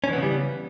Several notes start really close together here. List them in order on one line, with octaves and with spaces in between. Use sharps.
C#4 E3 B3 C#3 G3